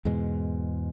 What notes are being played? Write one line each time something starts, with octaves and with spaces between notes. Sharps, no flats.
E2 G#2 B2 G#3